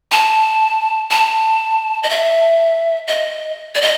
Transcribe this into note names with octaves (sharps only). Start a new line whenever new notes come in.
A5
A5
D#5
E5
D#5
D5
D#5